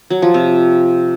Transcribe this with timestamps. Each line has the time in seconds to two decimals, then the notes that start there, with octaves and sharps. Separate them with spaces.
0.10 F#3
0.22 F3
0.34 C3